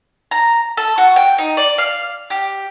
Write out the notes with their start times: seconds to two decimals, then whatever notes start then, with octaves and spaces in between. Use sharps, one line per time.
0.31 A#5
0.77 A4
0.98 F#4
1.16 G5
1.38 D#4
1.57 D5
1.78 F5
2.30 G4